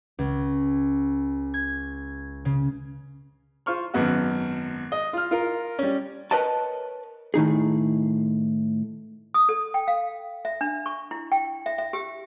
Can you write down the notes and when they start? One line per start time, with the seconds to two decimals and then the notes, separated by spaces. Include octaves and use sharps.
0.19 C#2
1.54 G#6
2.45 C#3
3.66 F4 C5 C#6 F6
3.94 G#1 F#2 B3 F#4
4.92 D#5
5.13 F4 F6
5.31 F4 A#4
5.79 G3 C#4
6.31 A#4 B4 C#5 D#5 G5 A5
7.34 A2 D#3 D#4 G#4
9.34 D#6
9.49 A4
9.74 G5
9.88 F5
10.45 E5
10.61 D4
10.86 C#6
11.11 E4
11.32 G5
11.66 E5
11.78 E5
11.93 G4